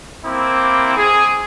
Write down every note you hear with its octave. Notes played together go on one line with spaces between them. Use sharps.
A#3 C4 E4 D6
G#4